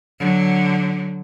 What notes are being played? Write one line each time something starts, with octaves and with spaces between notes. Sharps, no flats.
D3 F#3